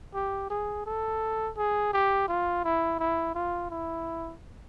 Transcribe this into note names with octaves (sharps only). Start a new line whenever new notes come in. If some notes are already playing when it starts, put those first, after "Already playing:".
G4
G#4
A4
G#4
G4
F4
E4
E4
F4
E4